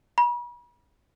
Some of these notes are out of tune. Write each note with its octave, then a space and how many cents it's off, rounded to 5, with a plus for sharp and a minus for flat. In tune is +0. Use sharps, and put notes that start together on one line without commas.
B5 -40